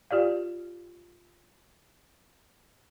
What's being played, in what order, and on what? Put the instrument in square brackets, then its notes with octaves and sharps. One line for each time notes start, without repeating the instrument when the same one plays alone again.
[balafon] F4 G4 D5 F5